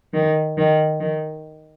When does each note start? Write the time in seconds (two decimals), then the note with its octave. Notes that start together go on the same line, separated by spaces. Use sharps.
0.13 D#3
0.58 D#3
1.01 D#3